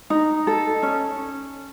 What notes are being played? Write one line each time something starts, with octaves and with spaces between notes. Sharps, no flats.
D#4
A4
C#4